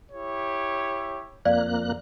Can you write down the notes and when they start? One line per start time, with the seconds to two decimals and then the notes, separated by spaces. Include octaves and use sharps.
0.11 E4 G4 C#5
1.45 F2 A#3 D5 F5 F#6